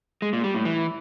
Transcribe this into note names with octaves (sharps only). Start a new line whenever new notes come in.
G#3
A#2
G3
A2
E3